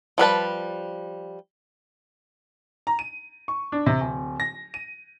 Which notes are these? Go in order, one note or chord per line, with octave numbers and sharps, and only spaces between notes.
F3 G3 B4 A5
A#5
D#7
C#6
D4
C3
D1
A#6
D#7